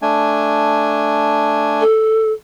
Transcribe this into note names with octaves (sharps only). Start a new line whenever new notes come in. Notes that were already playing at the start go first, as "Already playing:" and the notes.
A3 D4 G#5
A4